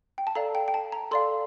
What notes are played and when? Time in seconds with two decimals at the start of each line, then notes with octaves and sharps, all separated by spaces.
0.18 G5
0.27 A5
0.35 A4 D5 F5 A#5
0.55 G5
0.68 G5
0.74 A5
0.92 A#5
1.11 A4 D5 F5 C6